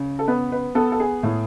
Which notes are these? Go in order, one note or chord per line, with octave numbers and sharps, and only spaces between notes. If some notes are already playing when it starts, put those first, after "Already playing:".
Already playing: C#3
A4
B3 B4
B4
B3 A4
A4
G#4
A2